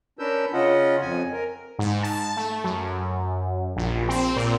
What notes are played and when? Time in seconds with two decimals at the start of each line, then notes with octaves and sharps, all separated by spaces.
0.19 C#4 D4 A#4 B4 E6 G6
0.53 C#3 C#4 F4 D#5 F#5
1.02 F2 G#5
1.32 A#4
1.79 G#2
2.03 A5
2.37 A3
2.64 F#2
3.76 A#1
4.09 C4
4.36 A#2